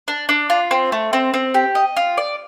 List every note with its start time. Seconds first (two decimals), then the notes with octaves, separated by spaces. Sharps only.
0.08 D4
0.29 D4
0.50 F4
0.71 C4
0.92 A3
1.13 C4
1.34 C4
1.54 G4
1.75 D#5
1.97 F4
2.18 D5